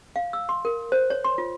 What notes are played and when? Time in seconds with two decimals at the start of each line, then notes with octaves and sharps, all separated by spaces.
0.16 F5
0.33 E6
0.49 C6
0.65 A#4
0.92 C5
1.10 C#5
1.24 C6
1.38 F4